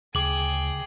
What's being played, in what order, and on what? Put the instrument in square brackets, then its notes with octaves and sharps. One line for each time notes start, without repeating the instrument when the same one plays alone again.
[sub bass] D2 [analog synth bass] C#3 [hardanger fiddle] G#4 G5 [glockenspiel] D6 F#7